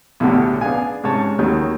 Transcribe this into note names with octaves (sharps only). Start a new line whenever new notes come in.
B1 E2 A2 D3 G4
B3 D4 G#4 F5 G#5
G#2 C3 C#4 C#5 A5
D#2 D#3 F#3 F#4